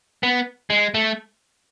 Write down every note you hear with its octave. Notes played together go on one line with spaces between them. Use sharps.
B3
G#3
A3